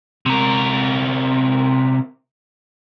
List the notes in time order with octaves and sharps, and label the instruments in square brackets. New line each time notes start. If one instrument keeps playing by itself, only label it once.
[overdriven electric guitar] C3 A#4